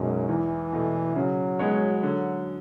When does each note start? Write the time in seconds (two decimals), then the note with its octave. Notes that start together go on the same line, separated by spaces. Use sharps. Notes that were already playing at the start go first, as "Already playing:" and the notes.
Already playing: B1 F#2 B2 G#3
0.29 E2 E3
0.72 B2 A3
1.16 C#3 F#3
1.59 G#3 B3 F#4 C#5
2.03 D3